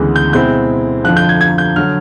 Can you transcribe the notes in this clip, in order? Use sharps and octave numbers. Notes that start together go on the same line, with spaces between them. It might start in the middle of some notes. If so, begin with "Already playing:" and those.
Already playing: D2 C#3 E3 G#3 B3
G6
B2 G#3 C4 E4 G6
F2 D3 F3 F#6
G6
G#6
G#6
G6
D3 F#3 F6